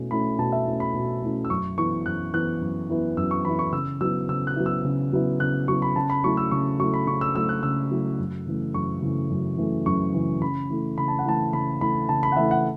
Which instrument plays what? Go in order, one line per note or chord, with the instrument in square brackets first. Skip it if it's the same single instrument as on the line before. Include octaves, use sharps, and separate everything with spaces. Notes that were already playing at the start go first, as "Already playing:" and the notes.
Already playing: [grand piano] B2 A3 C#4 E4
A3 C#4 E4 B5
B2 A5
E5
A3 C#4 E4
B5
B2
A3 C#4 E4
E6
F#2 C#6
E3 B3 E4 C#6
F#2 F#6
E3 B3 E4 F#6
F#2
E3 B3 E4
F#2 E6
C#6
E3 B3 E4 B5
C#6
C#3 E6
F#3 B3 E4 E6
C#3 E6
F#6
F#3 B3 E4
E6
C#3
F#3 B3 E4
C#3 F#6
F#3 B3 E4 C#6
B5
C#3 A5
B5
F#3 A3 E4 C#6
E6
C#3 C#6
F#3 A3 E4 C#6
B5
C#3 C#6
E6
F#3 A3 E4 E6
F#6
C#3 E6
F#3 A3 E4
F#2
C#3 E3 A3
F#2 C#6
C#3 E3 A3
F#2
C#3 E3 A3
F#2 C#6
C#3 E3 A3
C#3 B5
E3 A3 E4
C#3 B5
A5
F#5
E3 A3 E4 A5
C#3 B5
E3 A3 E4 B5
C#3 A5
B5
F#5
E3 A3 E4 E5
F#5